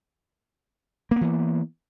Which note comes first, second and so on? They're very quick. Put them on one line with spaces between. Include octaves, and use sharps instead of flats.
A#3 B3 E3